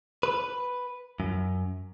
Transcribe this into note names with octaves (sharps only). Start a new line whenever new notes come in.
B4
F#2